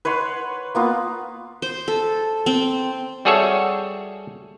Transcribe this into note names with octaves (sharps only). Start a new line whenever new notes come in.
B4 C#5 F#5 C6
A#3 B3 F4
C5
A4
C4
G3 F#4 G#4 A4 C#5 E5